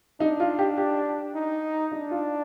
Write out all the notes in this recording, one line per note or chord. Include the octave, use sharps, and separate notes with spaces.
D4 D#4
F4
G4
G4
D#4
D4 D#4
F4